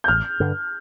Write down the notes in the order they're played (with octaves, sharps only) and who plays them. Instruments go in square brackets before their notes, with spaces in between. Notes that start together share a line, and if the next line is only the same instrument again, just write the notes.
[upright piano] G6
[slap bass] A1 [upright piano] F6
[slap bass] G2 D3